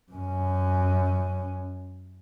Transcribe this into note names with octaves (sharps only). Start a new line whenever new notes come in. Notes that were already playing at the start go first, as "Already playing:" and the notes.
F#2 C#4